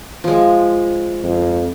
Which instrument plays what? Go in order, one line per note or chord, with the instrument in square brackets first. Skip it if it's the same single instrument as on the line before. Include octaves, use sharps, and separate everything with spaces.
[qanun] F3 G#3
[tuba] F2